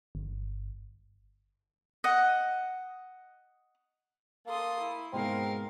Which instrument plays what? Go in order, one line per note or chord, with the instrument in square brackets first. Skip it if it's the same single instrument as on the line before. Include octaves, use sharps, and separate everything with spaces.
[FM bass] G1
[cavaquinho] D#5 F#5
[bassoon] A#3 [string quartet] A4 C6 D#6
[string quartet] E4
[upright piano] G#2 B2 [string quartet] G#3 A#4 F5 [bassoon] C4